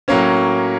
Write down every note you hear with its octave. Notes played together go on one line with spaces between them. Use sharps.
A2 F#3 A#3 C#4 C#5